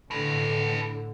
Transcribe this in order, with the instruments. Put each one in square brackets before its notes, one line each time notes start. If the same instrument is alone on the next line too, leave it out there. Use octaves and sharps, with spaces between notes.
[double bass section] A2 D3 [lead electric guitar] A4 B4